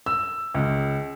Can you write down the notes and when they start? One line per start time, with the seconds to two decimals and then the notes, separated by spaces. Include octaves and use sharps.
0.06 E6
0.55 C#2